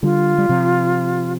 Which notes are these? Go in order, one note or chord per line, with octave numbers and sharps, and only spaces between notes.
D3 G3 F4
G3
C3 F3